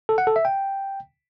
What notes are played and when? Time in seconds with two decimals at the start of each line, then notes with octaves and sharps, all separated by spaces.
0.09 A4
0.18 F#5
0.27 A4
0.36 E5
0.45 G5